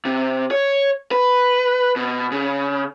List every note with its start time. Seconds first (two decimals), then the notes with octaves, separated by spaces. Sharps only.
0.05 C3
0.51 C#5
1.12 B4
1.96 B2
2.32 C#3